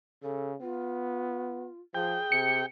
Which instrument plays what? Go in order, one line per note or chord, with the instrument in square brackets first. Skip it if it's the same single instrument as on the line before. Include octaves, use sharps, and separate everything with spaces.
[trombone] C#3 [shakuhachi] A4
[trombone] B3 [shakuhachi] F4
[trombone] F3 [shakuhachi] G#4 [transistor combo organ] G5
[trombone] C3 [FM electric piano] C#7